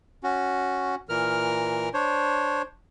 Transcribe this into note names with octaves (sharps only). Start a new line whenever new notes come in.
C#4 F#4
A#2 E3 A#4 F6
D4 C5 C#5